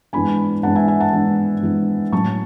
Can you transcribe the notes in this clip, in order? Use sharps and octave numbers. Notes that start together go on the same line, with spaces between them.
G#2 E3 B3 D4 G#5 B5
G#2 E3 B3 D4 F#5 A5
E5 G#5
E5 G#5
F#5 A5
G#2 E3 B3 D4
G#2 E3 B3 D4
A2 F#3 C#4 A5 C#6